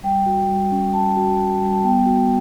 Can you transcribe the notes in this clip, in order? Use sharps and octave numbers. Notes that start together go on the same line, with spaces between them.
G3 G5
F#4
G3
C#4
G3 A5
F#4
F#4
G3
A5
B3 G5
F#4